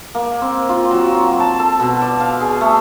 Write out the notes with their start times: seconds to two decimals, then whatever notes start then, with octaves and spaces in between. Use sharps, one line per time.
0.15 A#3
0.42 C4
0.69 F4
0.91 F#3
1.15 F4
1.40 A5
1.59 A4
1.80 B2
2.02 D5
2.20 F5
2.40 G#4
2.61 A3